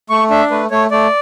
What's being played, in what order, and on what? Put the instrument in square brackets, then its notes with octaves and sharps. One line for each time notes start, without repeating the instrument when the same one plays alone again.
[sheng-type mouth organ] A3 C#6
D4 E5
A3 B4
A3 C#5
A3 D5